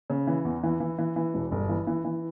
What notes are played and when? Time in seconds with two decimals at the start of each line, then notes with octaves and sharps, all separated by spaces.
0.10 C#3
0.27 E3
0.45 E2
0.63 E3
0.80 E3
0.99 E3
1.16 E3
1.34 E1
1.52 G1
1.69 E3
1.87 E3
2.05 E3